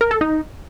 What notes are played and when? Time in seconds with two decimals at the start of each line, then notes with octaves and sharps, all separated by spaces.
0.01 A#4
0.11 A4
0.21 D#4